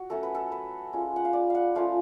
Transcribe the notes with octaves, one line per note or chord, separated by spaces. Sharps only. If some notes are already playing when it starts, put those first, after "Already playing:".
Already playing: F#4
F#3 A3 C#4 A4
B4
A4
B4
G#3 C#4 F4
F#5
F5
D5
F5 F#5
F3 A3 C#4 F4 F5